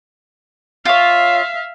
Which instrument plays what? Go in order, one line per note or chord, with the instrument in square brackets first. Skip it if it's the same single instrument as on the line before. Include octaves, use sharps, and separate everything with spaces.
[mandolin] F4 C#5 [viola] E5 F5